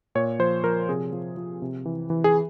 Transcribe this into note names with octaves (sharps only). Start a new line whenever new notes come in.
A#2 C#5
F3 C5
F3 A#4
C3 G#4
F3
F3
C3
E3
E3
G#4